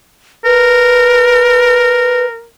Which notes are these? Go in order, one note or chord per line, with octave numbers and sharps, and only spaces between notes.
A#4 B4